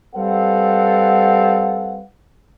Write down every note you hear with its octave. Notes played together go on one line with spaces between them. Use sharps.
G3 C4 A4 B4 F5 F#5